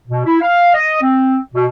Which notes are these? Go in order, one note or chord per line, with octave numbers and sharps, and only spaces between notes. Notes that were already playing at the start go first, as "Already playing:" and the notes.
B2
E4
F5
D#5
C4
B2